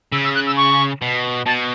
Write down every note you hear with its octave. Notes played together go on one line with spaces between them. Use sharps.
C#3 E6
E6
F#6
E6
C#6
B2
B2 A5